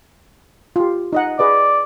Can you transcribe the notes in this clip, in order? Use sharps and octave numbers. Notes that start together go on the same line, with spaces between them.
F4 G4
D#4 D#5 F#5
G#4 B4 D5 D#5